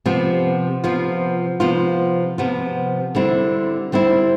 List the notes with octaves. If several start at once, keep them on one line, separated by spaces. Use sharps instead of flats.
C3 F3 B3 F4
C3 F3 B3 F4
C3 F3 B3 F4
C3 F3 B3 F4
D3 G3 C4 E4
D3 G3 C4 E4